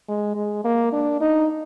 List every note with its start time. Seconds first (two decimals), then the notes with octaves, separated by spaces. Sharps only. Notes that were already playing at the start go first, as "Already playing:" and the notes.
0.09 G#3
0.36 G#3
0.64 A#3
0.92 D4
1.20 D#4